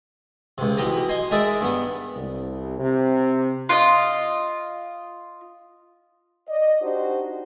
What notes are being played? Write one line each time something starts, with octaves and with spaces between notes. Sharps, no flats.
C#2 C3
B1 E3 G4 A#5 D#6
D#5 G#5 C6 D#6
G#3 D#4 G#4 A#4 D5 E5
G2 B3
C2
C3
F4 D#5
D5 D#5
D4 D#4 F#4 G4 C5